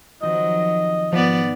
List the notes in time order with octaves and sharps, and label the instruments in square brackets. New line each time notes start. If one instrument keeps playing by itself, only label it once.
[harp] D#3 F3 C4 [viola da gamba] F#3 [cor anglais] D#5
[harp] G#2 D#4 [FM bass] F3 [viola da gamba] B3 D5